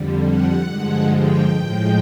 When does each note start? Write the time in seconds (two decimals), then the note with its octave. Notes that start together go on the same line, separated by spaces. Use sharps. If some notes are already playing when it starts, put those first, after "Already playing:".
Already playing: F2 D3 G3
0.22 F#5
0.66 G2 D3 F3 G#3
1.11 G5
1.55 A2 F3 G#3